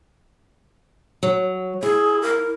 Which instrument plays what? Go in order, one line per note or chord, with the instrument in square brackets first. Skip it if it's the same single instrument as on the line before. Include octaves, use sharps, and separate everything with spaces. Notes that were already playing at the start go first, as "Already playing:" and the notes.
[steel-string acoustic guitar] F#3
[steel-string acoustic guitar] E4 [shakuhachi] G#4
[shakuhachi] A#4